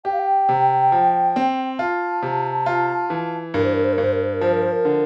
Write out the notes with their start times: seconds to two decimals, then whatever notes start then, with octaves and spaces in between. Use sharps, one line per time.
0.04 G4 G5
0.13 F5
0.19 G5
0.49 C3
0.92 F3
1.36 C4
1.79 F4 A5
2.22 C3
2.66 F4
3.10 E3
3.54 G2 A#4
3.64 C5
3.74 A#4
3.84 C5
3.93 A#4
3.98 G2
4.03 C5
4.13 A#4
4.23 C5
4.33 A#4
4.41 F3 C5
4.53 A#4
4.62 C5
4.72 A#4
4.85 D3